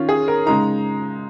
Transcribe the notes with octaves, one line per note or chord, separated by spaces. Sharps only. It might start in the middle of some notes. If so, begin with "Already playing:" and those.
Already playing: D#3 C#4 F4
G#4
A#4
C#3 G#3 D#4 A#5